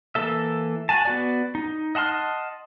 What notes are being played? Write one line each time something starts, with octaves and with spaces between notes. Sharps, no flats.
E3 A#3 A4 E5
F#4 G#5 A5
B3 F#4 D5
D#4
D#5 F#5 A5 C6 F6